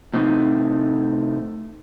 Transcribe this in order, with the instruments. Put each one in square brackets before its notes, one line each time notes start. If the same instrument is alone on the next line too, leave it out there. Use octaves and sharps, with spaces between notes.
[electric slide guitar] A2 C3 A3 C4 D#4